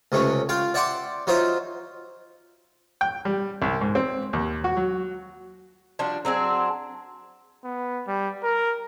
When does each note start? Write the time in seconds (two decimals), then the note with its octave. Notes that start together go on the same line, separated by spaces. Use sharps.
0.12 C#2 C3 A3 C#4
0.49 F4 F5 G5
0.74 D5 E5 F#5 G5 C6 D6
1.27 F#3 D#4 F4 C5 E5
3.01 G5
3.25 G3
3.62 C2
3.81 G#2
3.95 C4
4.33 D#2
4.64 F#4
4.77 F#3
5.99 F3 G3 D4 F#4
6.25 F#3 C4 D4 G#4
7.64 B3
8.07 G3
8.43 A#4